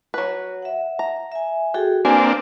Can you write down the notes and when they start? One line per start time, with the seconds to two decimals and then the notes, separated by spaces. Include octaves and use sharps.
0.14 F#3 B4
0.62 E5 F#5
0.99 A#5
1.32 E5 G#5
1.74 F#4 G#4 A4 G5
2.05 A#3 C4 D4 B4 G#5